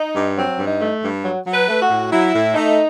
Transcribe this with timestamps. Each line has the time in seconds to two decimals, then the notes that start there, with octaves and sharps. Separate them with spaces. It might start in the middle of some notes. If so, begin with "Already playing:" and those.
Already playing: D#4
0.15 G2
0.36 F#3 C4
0.59 G2
0.66 D#4
0.80 A3
1.02 G2
1.24 F#3
1.45 F#3
1.53 B4
1.68 A3
1.82 F#4
1.89 A2
2.11 F#3 E4
2.33 A2
2.55 A3 D#4